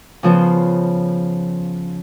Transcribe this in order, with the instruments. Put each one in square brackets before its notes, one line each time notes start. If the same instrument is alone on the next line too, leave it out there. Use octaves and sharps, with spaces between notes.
[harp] C#3 F3 B3